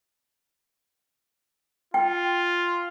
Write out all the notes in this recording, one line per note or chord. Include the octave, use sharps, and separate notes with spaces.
F4 G5